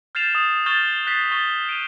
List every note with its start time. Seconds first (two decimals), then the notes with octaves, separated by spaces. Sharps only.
0.15 F6 G6 A6 C7 E7 F7
0.34 D#6 A6
0.66 C#6 F6 G6 A6 E7 G7
1.06 F#6 G6 A6 B6 C7
1.31 C#6 A6 G7
1.69 D7 D#7 F7